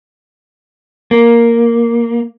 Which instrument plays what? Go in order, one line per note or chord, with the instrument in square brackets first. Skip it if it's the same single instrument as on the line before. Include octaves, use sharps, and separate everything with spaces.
[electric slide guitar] A#3